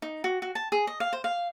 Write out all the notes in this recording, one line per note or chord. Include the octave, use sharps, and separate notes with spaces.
D#4
F#4
F#4
A5
G#4
D#5
F5
C5
F5